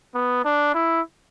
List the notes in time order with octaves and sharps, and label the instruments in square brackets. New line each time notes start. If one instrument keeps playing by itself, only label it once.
[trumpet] B3
D4
E4